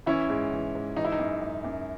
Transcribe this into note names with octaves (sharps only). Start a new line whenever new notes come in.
E3 C#4 E4
G#2
E3
G#2
E3 D#4
E4
D#4
F#2
F#2
F#2